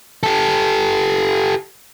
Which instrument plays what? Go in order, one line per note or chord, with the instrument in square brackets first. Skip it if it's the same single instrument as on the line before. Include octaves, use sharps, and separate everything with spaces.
[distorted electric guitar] G4 A4